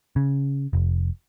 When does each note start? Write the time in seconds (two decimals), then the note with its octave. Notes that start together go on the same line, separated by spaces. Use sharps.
0.16 C#3
0.73 F1